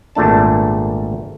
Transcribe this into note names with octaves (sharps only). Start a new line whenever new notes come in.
G#1 A#2 A3 D4 A5